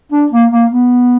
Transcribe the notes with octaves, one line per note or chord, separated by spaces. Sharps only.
D4
A#3
A#3
B3